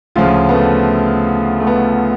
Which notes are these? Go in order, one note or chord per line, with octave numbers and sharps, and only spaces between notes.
D2 C#3 F3 F4
B3
A3
A3
B3